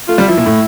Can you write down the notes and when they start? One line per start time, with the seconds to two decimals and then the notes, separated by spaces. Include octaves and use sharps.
0.08 A3 F4
0.18 G3
0.27 F3 E4
0.37 A#2
0.46 A2